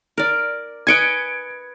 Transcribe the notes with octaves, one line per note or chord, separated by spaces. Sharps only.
A#4 D5
B4 D#5 G#5 G#6 C#7 D7